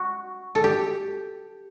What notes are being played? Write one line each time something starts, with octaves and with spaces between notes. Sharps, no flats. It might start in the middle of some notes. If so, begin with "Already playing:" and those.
Already playing: F#4
A4
G4